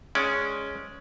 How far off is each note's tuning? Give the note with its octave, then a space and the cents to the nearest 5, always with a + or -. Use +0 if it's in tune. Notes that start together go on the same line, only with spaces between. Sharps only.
G#3 +0 C#4 +0 D5 +0